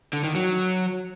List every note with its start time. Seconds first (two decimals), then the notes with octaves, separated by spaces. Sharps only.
0.13 D3
0.24 D#3
0.35 F#3